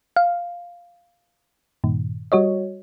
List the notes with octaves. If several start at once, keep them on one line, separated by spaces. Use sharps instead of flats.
F5
G2 A#2 D#3
G3 F#4 C#5 D#5